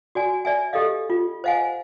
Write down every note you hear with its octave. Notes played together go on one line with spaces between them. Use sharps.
F#4 D5 G#5
D5 E5 G#5
G4 A4 D5 D#5 F5
F4
C5 D#5 F5 F#5 G#5